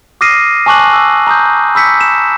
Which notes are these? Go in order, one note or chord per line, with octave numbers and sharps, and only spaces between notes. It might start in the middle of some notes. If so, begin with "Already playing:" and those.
D6 D#6 F6 A#6 C7 D#7
G#5 A5 C#6 D6 F#6 F#7
E6
A#5 D#6 G6
B5 E6 G6 B6 C#7
E7